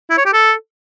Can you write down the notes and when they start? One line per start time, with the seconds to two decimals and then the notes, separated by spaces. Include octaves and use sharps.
0.10 E4
0.18 C#5
0.25 G4
0.33 A4